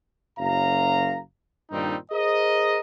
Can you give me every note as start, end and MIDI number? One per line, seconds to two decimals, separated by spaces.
0.38 1.19 30
0.38 1.19 42
0.38 1.19 77
0.38 1.19 82
1.71 1.96 43
1.71 1.96 46
1.71 1.96 51
1.71 1.96 55
1.71 1.96 60
1.71 1.96 63
2.12 2.80 68
2.12 2.80 70
2.12 2.80 72
2.12 2.80 75